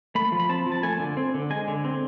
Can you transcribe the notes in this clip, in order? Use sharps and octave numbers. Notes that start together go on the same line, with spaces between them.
A3 B5
F3
B5
C4 A5
F3
A5
A3 G#5
D3
C4
D3
G#3 G#5
D3
C4